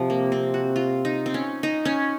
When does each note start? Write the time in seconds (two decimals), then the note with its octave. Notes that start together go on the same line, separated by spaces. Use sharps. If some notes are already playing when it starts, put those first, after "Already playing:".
Already playing: C3 F3
0.10 A#3
0.32 C4
0.54 F#4
0.76 F4
1.05 D#4
1.26 C4
1.34 C#4
1.63 D#4
1.85 C#4